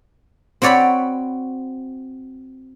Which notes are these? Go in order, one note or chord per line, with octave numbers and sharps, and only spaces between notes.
C4 F#4 C#5 D5 F#5 B5